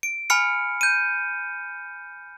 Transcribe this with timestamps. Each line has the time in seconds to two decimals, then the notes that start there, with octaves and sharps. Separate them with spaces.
0.03 D7
0.30 G#5 B5 F6 C#7
0.81 G6 D#7